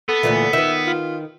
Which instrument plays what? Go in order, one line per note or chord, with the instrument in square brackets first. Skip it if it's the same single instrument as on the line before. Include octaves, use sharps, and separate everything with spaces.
[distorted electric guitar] B3 [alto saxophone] A4
[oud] D2 A#2 E3
[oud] D#3 B4 [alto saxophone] E5
[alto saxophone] F4